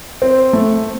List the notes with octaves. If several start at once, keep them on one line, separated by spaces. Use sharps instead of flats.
C4
A3